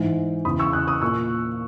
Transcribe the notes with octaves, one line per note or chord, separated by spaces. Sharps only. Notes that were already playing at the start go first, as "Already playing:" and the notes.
Already playing: G#2 E3
E2 C#3 E3 B5 D#6
C#6 E6
D#6 F#6
D#6 F#6
A#2 C#6 E6